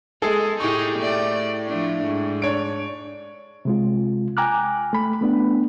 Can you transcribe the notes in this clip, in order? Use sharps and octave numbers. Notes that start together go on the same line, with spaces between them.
G#3 G#4 A4
A2 D#4 G4 G#4 C#6
A3 D5
F3 A3 D4
G#2
D4 C#5 D7
C3 G#3 F4
G5 G#5 A#5 D6 F6 F#6
A3 B5
A3 B3 D4